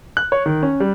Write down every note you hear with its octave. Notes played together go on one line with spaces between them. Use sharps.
F#6
C#5
D#3
C#4
G3